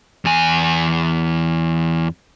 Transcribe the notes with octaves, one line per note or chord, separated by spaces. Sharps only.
E2 G#5